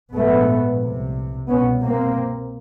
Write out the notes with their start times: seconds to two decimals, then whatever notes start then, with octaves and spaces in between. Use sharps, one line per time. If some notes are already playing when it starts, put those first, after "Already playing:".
0.13 A#1 G#2 A3 B3
0.81 C2 C3
1.49 C2 B2 B3 C#4
1.82 A#3 C4